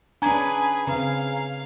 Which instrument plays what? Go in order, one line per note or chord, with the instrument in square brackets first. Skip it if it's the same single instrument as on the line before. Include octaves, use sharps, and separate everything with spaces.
[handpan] C#4 D4 [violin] G#4 B4 [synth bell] G#5 A#5 G#6
[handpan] C#3 C4 B4 [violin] F5